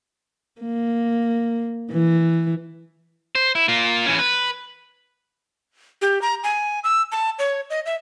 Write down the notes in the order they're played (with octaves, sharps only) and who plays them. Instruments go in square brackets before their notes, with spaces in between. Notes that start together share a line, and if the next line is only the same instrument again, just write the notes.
[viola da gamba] A#3
E3
[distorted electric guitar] C5
E4
A#3 F4
E3 C#4
B4
[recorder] G4
A#5
G#5
E6
A5
C#5
D#5
E5